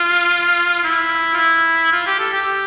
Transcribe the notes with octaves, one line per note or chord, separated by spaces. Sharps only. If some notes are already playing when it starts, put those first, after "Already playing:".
Already playing: F4
E4
F4
E4
F4
G4
A4
G4